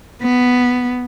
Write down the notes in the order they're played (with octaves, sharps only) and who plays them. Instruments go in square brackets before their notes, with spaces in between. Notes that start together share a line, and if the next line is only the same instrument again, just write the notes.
[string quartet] B3